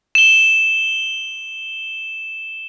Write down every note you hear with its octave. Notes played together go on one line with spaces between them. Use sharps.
E7 G7